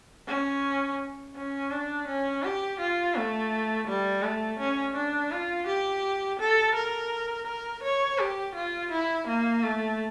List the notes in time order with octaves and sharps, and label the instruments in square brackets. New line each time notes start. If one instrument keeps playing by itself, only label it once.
[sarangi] C#4
C#4
D4
C#4
G4
F4
A3
G3
A3
C#4
D4
F4
G4
A4
A#4
A#4
C#5
G4
F4
E4
A#3
A3